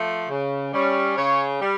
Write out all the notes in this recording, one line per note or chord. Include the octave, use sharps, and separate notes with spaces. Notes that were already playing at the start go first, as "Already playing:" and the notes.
Already playing: F3 A3
C#3
G3 C#4
C#3 C#5
G3